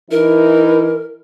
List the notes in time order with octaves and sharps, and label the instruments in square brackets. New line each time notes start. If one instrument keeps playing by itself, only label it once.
[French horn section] E3 D#4 E4 [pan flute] A#4